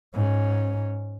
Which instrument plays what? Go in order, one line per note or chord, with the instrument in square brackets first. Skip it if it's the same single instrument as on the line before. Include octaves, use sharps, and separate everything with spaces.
[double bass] G#2 C#4